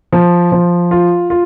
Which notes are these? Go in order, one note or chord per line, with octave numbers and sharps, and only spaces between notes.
F3
F3
F4
F4